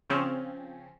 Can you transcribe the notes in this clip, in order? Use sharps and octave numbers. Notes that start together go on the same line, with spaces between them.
C#3 F3 C4 C#4